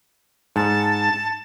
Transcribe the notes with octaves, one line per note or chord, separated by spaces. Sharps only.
G#2 A5